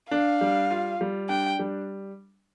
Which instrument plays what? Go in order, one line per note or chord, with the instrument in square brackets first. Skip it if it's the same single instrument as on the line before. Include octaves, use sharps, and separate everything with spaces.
[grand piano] D4 [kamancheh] F5
[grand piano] G3
F4
G3
[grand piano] D4 [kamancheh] G5
[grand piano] G3